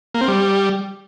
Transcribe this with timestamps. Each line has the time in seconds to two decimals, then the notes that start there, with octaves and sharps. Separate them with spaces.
0.14 A#3
0.21 C4
0.28 G3